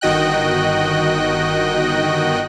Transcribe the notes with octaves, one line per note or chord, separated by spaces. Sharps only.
G1 D#3 F#4 D#5 G5 F#6